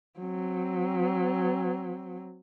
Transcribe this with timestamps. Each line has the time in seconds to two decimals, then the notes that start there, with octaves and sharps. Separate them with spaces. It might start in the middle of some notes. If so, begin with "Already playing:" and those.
0.20 F#3 C4